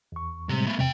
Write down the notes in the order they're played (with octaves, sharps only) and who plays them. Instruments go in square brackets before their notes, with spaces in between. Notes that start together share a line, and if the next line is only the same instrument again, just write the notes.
[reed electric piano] E2 C#6
[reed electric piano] A2 G3 G#3 [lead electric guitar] C3
[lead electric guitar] A3 B3
[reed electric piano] E2 C3 [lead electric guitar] A3 G5